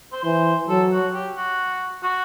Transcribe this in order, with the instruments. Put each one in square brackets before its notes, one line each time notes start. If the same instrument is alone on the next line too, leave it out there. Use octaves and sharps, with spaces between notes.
[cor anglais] C5
[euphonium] E3 [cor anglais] C5
[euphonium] F#3 [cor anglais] A4
[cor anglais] F#4
G4
F#4
F#4